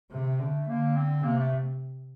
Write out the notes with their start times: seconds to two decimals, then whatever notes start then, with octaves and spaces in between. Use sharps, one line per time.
0.11 C3 A3
0.40 D3
0.68 D3 A#3
0.96 C4
1.24 C3 A#3
1.39 A3